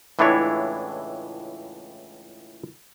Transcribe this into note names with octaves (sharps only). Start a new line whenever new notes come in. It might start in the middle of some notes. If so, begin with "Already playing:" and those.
C#2 A2 E3 D4 E4 C#5